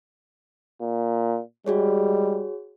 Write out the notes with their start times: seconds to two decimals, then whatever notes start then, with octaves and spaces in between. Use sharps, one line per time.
0.82 A#2
1.66 G3 G#3 F#4 G#4 C#5